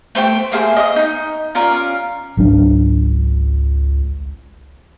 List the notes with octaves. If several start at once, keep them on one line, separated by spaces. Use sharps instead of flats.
A3 C5 F5 G5
A3 A#3 G#4 C5
D#5 D6 D#6
D#4
C#4 F4 A#4 D5
G#1 C#2 F#3 D4